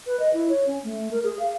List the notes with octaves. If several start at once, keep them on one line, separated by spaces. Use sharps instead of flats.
B4
D#5
E4
C#5
C#4
A3
A#4
G#4
F5